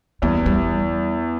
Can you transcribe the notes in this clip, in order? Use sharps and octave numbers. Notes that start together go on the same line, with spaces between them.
E2 G3
G3